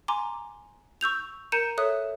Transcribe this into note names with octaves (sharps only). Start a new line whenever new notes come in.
G#5 A#5 C6 D6
C#6 E6 G6 F7
A#4 A#5 G6 C#7 D#7 E7
A4 C#5 E5 D#6 F#6